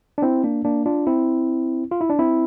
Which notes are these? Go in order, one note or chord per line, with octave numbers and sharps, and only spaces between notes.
D4
C4 E4
A#3 D4
A#3 D4
D4 F4
C4 E4
F4
E4
D4
C4 E4